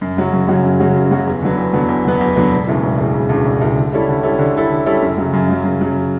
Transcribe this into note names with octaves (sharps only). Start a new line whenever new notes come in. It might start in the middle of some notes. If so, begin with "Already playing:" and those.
F#2
C#3 F#3 C#4 F#4
F#2
C#3 F#3 C#4 F#4
F#2
C#3 F#3 C#4 F#4
F#2
C#3 F#3 C#4 F#4
E2
D3 F#3 B3
E2
D3 F#3 B3
E2
D3 F#3 B3
E2
D3 F#3 B3
E1
D2 C#3 E3
E1
D2 C#3 E3
E1
D2 C#3 E3
E1
D2 C#3 E3
D3
G3 C#4 E4 A4
D3
G3 C#4 E4 A4
D3
G3 C#4 E4 A4
D3
G3 C#4 E4 A4
F#2
C#3 F#3
F#2
C#3 F#3
F#2
C#3 F#3